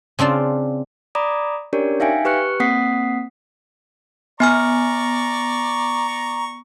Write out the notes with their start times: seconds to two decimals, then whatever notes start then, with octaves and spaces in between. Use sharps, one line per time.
0.19 C#3 C4 D4 F4
1.15 D5 A#5 B5 D6 D#6
1.73 C#4 D4 G4 A#4 C#5 D5
2.00 D#4 E5 F5 G5 G#5
2.25 G4 B4 C#6 F#6 C#7
2.60 A#3 C4 F#5 D#6 B6 C7
4.40 B3 D5 G#5 A#5 C#6 F6